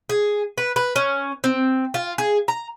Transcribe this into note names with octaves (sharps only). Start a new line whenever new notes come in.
G#4
B4
B4
C#4
C4
F4
G#4
A#5